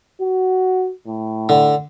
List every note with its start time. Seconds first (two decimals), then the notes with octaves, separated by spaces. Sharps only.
0.21 F#4
1.07 A2
1.49 D3